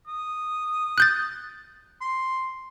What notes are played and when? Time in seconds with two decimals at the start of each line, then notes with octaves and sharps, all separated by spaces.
0.08 D#6
0.98 F#6 G6 A6
2.01 C6